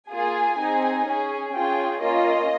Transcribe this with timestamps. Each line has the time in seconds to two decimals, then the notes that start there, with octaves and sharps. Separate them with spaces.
0.09 A#3 F4 G#4 G#5
0.57 C4 D#4 G#4
1.05 C#4 G#4
1.53 C#4 F4 G#4 G5
2.01 A#3 C#4 F4 D#5